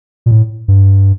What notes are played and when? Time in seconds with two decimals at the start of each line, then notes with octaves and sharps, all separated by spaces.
0.26 A#2
0.31 A2
0.68 G2